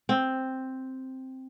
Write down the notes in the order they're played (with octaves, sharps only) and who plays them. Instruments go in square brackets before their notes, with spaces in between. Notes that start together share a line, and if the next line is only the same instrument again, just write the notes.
[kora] C4